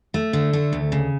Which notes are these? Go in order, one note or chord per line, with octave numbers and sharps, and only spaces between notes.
A3
D3
A3
D2
C#3